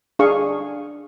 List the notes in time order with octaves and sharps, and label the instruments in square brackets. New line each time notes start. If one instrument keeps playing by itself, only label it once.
[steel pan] D4 G#4 F5 C#6